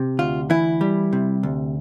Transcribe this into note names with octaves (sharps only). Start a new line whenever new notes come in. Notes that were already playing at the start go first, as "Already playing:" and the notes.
Already playing: C3
D2 F4
E3 E4
G3
C3
D2